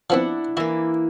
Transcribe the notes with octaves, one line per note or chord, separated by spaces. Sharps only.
F3 B3 C4 D4 E4 F#5
E3 A#3 E4